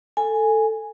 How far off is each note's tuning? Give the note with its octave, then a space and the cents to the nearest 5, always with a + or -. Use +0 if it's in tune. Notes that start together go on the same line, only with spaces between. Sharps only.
A4 +10 G#5 +0